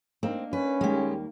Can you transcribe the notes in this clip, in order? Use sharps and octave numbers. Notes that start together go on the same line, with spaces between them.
A#3 C4 D4 D#4
C#4 B4
D#2 G3 G#3 A#3 G4